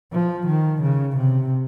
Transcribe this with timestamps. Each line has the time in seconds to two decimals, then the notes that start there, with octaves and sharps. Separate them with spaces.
0.13 F3
0.47 D#3
0.82 C#3
1.17 C3